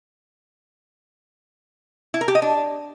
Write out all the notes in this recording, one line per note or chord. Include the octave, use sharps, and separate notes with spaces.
E4
A#4
G4
D#5
D4